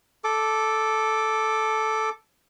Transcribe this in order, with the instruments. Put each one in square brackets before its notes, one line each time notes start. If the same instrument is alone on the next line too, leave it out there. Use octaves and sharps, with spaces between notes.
[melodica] A4 D6